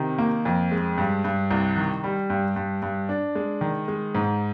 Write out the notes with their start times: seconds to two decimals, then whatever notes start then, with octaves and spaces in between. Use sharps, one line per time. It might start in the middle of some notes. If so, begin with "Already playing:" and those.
Already playing: C3 D#3
0.18 A#3
0.45 F2
0.72 G#3
0.98 G2
1.24 G2
1.51 C2
1.77 D#3
2.04 G3
2.30 G2
2.56 G2
2.82 G2
3.09 D4
3.35 G#3
3.61 D#3
3.88 G#3
4.15 G#2